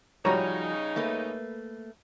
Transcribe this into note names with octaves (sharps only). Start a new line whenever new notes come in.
C#3 F3 G3 C#4 D#4 F#4 C#5 A#5
A3 A#3 B4